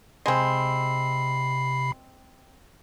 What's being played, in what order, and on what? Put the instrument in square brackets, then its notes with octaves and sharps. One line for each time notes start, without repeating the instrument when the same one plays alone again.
[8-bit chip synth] C3 B5 C7 [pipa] G#3 C4